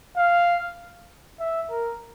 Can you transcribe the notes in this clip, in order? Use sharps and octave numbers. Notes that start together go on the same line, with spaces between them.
F5
E5
A#4